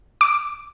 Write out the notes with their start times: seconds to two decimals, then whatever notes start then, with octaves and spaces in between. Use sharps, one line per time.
0.21 D6